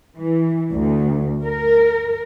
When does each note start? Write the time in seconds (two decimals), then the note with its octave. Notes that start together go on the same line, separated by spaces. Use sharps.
0.16 E3
0.73 D2
1.44 A#4